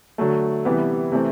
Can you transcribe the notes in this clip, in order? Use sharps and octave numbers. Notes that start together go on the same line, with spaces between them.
D3 F#3 A3
C3 E3 G3 B3
C3 E3 A3 C4